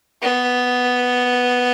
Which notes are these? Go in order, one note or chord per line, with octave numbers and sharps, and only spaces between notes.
B3